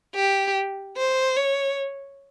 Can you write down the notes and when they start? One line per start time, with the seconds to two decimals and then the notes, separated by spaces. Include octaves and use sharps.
0.15 G4
0.97 C5
1.36 C#5